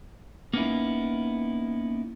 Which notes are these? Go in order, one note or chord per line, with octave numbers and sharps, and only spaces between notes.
A#3 B3 C#4 D#4 E4